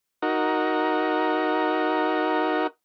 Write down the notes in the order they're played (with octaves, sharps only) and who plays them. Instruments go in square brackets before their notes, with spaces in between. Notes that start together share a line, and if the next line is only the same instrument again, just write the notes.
[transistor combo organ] D#4 F#4 A#4